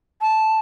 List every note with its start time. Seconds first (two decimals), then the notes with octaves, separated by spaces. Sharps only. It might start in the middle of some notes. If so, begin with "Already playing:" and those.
0.21 A5